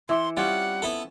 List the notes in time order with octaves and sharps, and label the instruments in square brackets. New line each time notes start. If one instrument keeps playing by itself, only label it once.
[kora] E3 [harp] E5 D6 C#7 [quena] C6
[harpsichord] G3 [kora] C4 C#4 F4 [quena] F#5
[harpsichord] B3 E4 A4